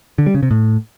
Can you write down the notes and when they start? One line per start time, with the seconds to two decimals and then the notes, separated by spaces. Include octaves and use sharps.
0.18 D3
0.26 G3
0.35 C#3
0.43 C3
0.51 A2